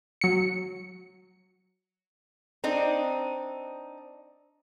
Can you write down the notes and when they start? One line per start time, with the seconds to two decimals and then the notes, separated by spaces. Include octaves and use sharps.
0.21 F#3 C#7
2.64 C4 D4 D#4